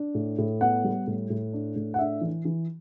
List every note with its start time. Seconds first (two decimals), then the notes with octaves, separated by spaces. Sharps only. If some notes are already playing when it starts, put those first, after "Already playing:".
Already playing: D4
0.15 A2
0.38 A2
0.61 B3 F#5
0.84 G3
1.07 A2
1.30 A2
1.53 D4
1.76 A2
1.94 F#5
1.99 D4 E5
2.21 E3
2.45 E3